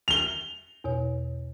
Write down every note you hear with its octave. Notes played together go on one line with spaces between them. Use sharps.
F7 G7
E2 B2 C#5